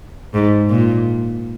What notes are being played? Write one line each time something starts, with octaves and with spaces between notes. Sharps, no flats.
G#2
A#2